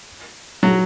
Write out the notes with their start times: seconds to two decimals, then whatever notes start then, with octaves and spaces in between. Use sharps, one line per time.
0.63 F#3